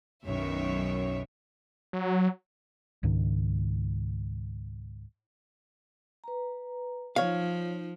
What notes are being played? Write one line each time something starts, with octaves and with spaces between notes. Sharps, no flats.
B1 F#2 D#3 C#5 E5
F#3
C#2 G#2 D#3
B4 A#5
F3 D#4 C#5 F5